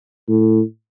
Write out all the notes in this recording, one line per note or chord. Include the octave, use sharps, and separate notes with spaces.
A2